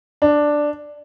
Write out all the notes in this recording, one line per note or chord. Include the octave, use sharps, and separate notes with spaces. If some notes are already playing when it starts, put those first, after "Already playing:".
D4